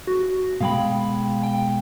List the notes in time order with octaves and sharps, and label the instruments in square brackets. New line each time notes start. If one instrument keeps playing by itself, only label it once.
[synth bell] F#4
[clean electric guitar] B2 G#3 B5 [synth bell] F5 G5
[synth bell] G5